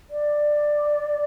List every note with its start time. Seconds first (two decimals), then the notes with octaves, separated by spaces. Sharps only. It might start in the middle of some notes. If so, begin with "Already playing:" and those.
0.10 D5